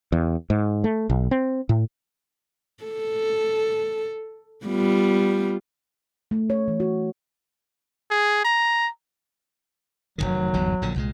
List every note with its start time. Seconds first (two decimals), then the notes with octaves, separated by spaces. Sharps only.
0.12 E2
0.50 G#2
0.84 A3
1.10 B1
1.31 C4
1.69 A2
2.84 A4
4.66 G3 B3 F4
6.31 A3
6.50 C#5
6.68 E3
6.80 F#4
8.11 G#4
8.45 A#5
10.18 F1 B1 D#3 F#3
10.53 G1 E2 G#2
10.82 A#1 A#2 D3
10.96 C2 A#2 G#3